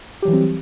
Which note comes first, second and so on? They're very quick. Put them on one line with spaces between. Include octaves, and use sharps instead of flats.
G4 F#3 E3 G3 C4